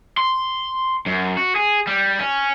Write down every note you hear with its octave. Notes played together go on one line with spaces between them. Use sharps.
C6
F#2
F#4
G#4
G3
C#4